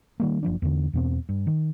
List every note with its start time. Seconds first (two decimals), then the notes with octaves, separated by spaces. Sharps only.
0.20 D#3 G3 A#3
0.43 F#1 F3 D4
0.62 E2 D3
0.93 E2 B2 C4
1.29 G2
1.47 D#3